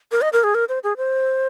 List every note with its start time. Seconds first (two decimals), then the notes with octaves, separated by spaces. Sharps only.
0.12 A#4
0.22 D#5
0.33 A#4
0.44 G#4
0.55 A#4
0.69 C5
0.83 G#4
0.97 C5